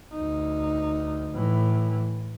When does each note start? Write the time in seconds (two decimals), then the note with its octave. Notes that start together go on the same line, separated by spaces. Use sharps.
0.13 D2 D#4
1.32 A2 E3